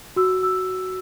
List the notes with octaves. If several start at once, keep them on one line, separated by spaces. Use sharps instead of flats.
F#4 E6
E6